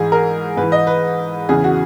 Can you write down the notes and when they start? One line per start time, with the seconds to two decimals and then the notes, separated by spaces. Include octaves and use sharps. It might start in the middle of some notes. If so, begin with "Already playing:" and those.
Already playing: G#2 E3 G#4
0.12 A#4
0.57 G#2 E3 B4
0.72 D#5
0.87 B4
1.49 E2 C#3 E3 G#4
1.64 F#4